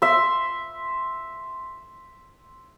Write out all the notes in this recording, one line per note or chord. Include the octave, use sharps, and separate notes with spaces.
E5 C6